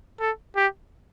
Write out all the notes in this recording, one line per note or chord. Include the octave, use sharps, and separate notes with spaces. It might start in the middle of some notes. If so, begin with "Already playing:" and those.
A4
G4